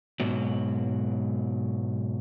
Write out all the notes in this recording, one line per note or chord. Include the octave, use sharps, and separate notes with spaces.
G#2 B2 F#3